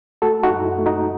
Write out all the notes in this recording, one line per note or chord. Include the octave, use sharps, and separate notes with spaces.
A3 F#4 A4
D#4 F#4
F#2
E4
A3
D#4 F#4